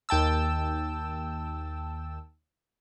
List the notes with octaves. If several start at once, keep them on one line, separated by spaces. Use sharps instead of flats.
D#2 G5 A5 E6